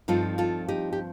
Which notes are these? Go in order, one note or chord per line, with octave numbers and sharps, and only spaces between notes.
G2 F3 C4 D#4 F4 A4
F4 A4
D#4 G4
G4